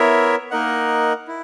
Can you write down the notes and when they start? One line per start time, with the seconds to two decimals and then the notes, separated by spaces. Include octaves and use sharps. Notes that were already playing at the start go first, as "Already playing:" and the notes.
Already playing: B3 E4 A#4 C#5 E5
0.51 A#3 D#4 A#4 D#5 F#5
1.28 E4